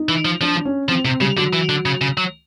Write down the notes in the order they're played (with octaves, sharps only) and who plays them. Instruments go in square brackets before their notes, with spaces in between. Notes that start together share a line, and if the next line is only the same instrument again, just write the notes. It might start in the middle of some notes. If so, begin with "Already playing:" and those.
Already playing: [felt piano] D#4
[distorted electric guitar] E3
F3
[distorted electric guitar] F3 [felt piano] D4
[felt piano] D4
C#4
[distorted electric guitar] F3 [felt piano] C4
[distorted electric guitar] C3 [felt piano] C4
[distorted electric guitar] C#3 [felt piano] G3
[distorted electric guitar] D3 [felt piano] F#3
[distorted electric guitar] E3
D3
C#3
C#3
F#3